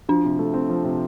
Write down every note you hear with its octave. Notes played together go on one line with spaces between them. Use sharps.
F3 D4
C3
A3
C4
F3
C3